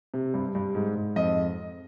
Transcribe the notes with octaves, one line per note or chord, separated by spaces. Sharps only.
C3
G2
G2
G#2
G#2
F2 D#5